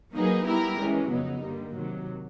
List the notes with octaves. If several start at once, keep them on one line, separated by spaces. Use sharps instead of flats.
F#3 A#3 D#4 G#4 B4
G3 B3 E4 G4 A#4
E3 G#3 C#4
F2 C#3 F#3 B3 D#4
G2 D3 G3 A#3
C3 D#3 F#3